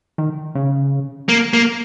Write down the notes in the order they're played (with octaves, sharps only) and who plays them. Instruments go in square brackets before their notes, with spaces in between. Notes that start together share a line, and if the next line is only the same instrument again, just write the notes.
[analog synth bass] D#3
C#3
[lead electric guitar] A#3
A#3